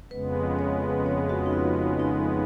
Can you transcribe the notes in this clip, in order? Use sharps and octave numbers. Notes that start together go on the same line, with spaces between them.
F2 C#3 G#3 B3 B4
C#5
C#5
F#4
D#4
F4
D#4
D#4